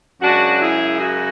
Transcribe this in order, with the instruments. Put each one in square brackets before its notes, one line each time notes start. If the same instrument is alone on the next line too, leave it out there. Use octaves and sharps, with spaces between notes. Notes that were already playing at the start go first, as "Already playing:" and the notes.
[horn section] F#2 C#3 G#3 D4 F#4
E4 G#4
F#4